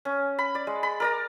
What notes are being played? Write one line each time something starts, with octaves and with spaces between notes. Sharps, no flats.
C#4
B5
D5
G#3
B5
A#4 D5 A#5